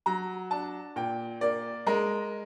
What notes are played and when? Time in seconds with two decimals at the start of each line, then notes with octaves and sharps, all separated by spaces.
0.06 F#3 A#5
0.51 D4 A5
0.96 A#2 G5
1.41 A#3 D5
1.87 G#3 A#4